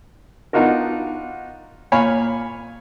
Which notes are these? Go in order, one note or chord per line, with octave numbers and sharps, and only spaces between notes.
B3 D4 D#4 F4 F#4 A#4
A#2 C#5 F5 G#5 B5